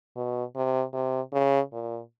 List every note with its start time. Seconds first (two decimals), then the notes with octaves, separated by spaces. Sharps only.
0.17 B2
0.56 C3
0.94 C3
1.33 C#3
1.73 A#2